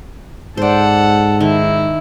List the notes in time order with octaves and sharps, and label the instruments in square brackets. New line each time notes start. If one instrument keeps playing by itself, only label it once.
[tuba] G#2 [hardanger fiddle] A4 F#5 [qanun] C5 D5
[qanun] D#3 [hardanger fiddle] E4